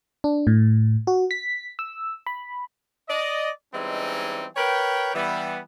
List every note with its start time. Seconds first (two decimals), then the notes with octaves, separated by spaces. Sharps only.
0.24 D4
0.47 A2
1.07 F#4
1.31 B6
1.79 E6
2.27 B5
3.09 D5 D#5
3.74 E3 G3 G#3 C4 C#4 D#4
4.56 A#4 B4 C#5 G5
5.14 E3 G3 B3